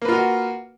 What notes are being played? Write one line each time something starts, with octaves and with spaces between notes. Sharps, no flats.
A#3 F4 F#4 B4